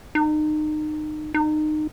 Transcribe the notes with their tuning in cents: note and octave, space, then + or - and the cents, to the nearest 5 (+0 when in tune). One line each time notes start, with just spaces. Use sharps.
D#4 -30
D#4 -25